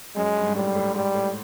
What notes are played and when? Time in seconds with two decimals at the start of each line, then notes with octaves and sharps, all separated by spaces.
0.16 F#2 G#3
0.36 G2
0.46 G#2
0.56 A2 G3
0.75 A2
0.95 G#2 G3
1.14 A2